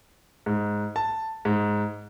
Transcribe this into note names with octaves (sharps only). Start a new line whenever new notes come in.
G#2
A5
G#2